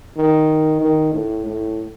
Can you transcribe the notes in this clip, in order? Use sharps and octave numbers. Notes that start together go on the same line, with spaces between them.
D#3
D#3
A2
A2